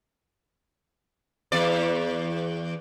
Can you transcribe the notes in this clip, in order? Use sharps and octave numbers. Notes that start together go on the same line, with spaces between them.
E2 D5